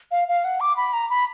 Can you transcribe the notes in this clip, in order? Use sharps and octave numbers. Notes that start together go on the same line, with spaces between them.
F5
F5
F#5
D6
B5
A#5
B5